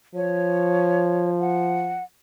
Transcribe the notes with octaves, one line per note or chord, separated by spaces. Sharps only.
F3 C#5
F#5